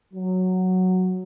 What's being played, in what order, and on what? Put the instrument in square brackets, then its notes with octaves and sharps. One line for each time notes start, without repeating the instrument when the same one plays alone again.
[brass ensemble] F#3